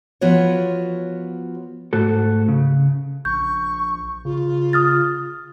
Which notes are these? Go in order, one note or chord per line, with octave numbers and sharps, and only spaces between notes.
F3 B3 F4 F#4 C#5
G#2 A3 F#4 A4
C#3
A#1 C#6 G6
C#3 F4
D#6 F6 A6